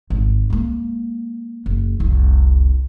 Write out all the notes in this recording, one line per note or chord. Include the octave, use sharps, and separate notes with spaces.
G#1
G#3 A#3
F#1
F1 C2